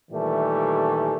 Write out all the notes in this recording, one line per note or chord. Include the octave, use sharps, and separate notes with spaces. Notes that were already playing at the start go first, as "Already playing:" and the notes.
A#2 D#3 E3 G3 A3